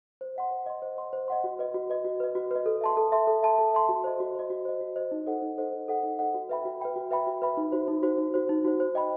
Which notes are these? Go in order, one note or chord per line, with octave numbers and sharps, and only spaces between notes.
C5
D#5 F#5 C6
C5
D#5 F#5 C6
C5
D#5 F#5 C6
C5
D#5 F#5 C6
F#4
B4 D#5
F#4
B4 D#5
F#4
B4 D#5
F#4
B4 D#5
A4
E5 A5 C6
A4
E5 A5 C6
A4
E5 A5 C6
A4
E5 A5 C6
F#4
C5 D#5
F#4
C5 D#5
F#4
C5 D#5
F#4
C5 D#5
D#4
A4 C5 D#5 F#5
D#4
A4 C5 D#5 F#5
D#4
A4 C5 D#5 F#5
D#4
A4 C5 D#5 F#5
F#4
B4 E5 G5 B5
F#4
B4 E5 G5 B5
F#4
B4 E5 G5 B5
F#4
B4 E5 G5 B5
D#4
F#4 C5
D#4
F#4 C5
D#4
F#4 C5
D#4
F#4 C5
C5
D#5 G5 B5